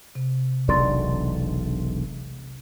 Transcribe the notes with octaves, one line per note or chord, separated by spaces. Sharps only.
C3
E1 B1 D3 D5 C6 A6